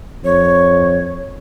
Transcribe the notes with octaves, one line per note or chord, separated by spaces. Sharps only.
F2 C#5